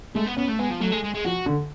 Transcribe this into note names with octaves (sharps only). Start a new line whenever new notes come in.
G#3 A3
B3
B3 C#4
A3
G#3 B3
F3
F#3 A3
G#3
G#3
G#3
F3 F#4
D3